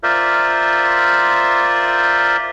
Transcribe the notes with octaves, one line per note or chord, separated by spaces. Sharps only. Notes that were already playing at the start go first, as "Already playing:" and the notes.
F4 A#4 C5 D5 E5